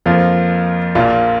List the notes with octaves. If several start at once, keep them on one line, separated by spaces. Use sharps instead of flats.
F2 F3 A#3
A#1 A#2 A#3 F4